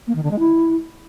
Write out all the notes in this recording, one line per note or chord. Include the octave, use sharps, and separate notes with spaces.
A#3
D#3
D3
G#3
E4